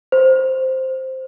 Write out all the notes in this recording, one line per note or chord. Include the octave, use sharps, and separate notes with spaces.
C5